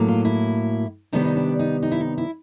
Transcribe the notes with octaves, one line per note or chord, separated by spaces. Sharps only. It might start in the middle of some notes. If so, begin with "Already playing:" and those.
Already playing: A2 F#3 A#3
F4
E4
C3 D#3 G3 B3 D4 D#4
D#4
D4
D#4
D#4
E4
D#4
E4